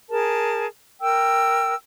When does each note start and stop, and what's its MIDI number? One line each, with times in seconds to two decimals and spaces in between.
0.09 0.66 68
0.09 0.66 70
0.09 0.66 81
1.01 1.73 70
1.01 1.73 79
1.01 1.73 88